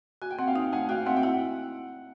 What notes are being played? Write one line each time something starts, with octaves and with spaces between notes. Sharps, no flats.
F#4 G#5
G5
C4 F#5
F5 G5
D#4
A3 F#5 G#5
F#4 F5 G5
C4 E5 F#5
G5
E4 F#5